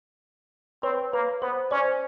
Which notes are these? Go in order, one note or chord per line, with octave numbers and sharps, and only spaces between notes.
C4 B4 C#5
A#3 B4
B3 C5
C#4 C5 D5